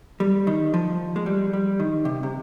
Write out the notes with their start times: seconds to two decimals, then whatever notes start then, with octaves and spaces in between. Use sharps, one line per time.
0.20 G3
0.47 D#3
0.74 F3
1.16 G#3
1.26 G3
1.53 G3
1.80 D#3
2.05 C3
2.23 C3